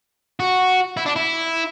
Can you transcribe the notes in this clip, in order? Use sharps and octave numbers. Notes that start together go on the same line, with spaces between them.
F#4
E4
D4
E4